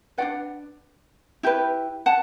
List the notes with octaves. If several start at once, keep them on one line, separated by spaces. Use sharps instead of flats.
D4 F#4 B4 D5 F#5
E4 G4 B4
F#5 A5